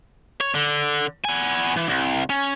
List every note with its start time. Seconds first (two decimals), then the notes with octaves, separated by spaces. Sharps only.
0.41 C#5
0.55 D3
1.24 B3 G#5
1.76 E3
1.89 C2
2.30 C#4